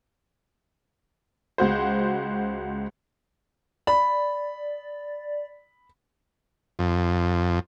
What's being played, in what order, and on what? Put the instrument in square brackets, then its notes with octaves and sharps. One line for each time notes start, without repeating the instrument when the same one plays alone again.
[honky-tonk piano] C#2 F#4 C5
[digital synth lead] D5 [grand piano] B5
[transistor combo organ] F2